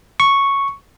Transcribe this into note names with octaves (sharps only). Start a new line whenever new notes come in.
C#6